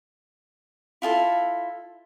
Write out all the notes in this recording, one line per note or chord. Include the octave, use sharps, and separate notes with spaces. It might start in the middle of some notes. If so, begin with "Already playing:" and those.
E4 F4 G#4 A4